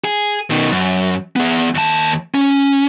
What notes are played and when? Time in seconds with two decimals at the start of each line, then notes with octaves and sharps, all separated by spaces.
0.04 G#4
0.50 B2 D#3
0.71 F#2
1.36 B3 G#4
1.75 D#2 A5
2.35 C#4